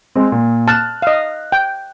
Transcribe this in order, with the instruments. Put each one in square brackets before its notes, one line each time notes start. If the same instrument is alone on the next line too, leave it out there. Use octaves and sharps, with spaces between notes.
[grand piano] G#3 C4
A#2
[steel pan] A5 [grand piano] F6 F#6
[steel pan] D#5 F5
G5